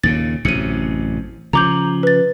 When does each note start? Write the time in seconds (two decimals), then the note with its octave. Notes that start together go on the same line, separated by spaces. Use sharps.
0.04 D#2 A#2 C#3 A6
0.45 A1 F#2 C3 C#7 D#7
1.53 C#3 F3 A#5 D6 G6
2.03 B4 A6